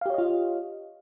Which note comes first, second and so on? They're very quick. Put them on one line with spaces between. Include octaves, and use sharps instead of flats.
F5 G4 C#5 D#5 F4